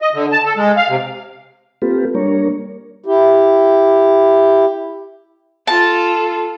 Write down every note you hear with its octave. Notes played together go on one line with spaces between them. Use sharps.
D#5
D3
A5
A4
G#3
F5
C3
A#3 C4 F4 G4 A4 B4
G3 A#3 D4 A#4 C#5
E4 G4
F4 A4 A5